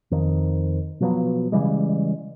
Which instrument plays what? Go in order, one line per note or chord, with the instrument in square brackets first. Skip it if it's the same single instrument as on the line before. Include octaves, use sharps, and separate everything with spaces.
[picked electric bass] F2 D#3
B2 F3 F#3 B3
C#3 E3 G3 G#3